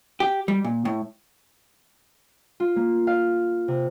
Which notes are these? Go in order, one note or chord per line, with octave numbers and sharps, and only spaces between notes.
G4
G3
A#2
A2
F4
A#3
F5
C3